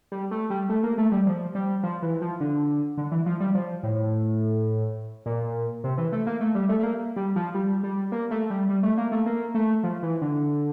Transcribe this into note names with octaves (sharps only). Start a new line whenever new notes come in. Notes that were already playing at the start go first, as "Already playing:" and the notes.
G3
A3
G3
A3
A#3
A3
G3
F3
G3
F3
E3
F3
D3
D3
E3
F3
G3
F3
A2
A#2
C3
E3
A3
A#3
A3
G3
A3
A3
A#3
G3
F3
G3
G3
A#3
A3
G3
G3
A3
A#3
A3
A#3
A3
F3
E3
D3